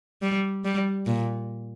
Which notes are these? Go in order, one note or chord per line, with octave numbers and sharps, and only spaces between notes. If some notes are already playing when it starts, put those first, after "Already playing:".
G3
G3
A#2